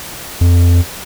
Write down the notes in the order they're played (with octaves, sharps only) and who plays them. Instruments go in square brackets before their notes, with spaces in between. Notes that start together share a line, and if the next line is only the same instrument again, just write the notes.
[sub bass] F2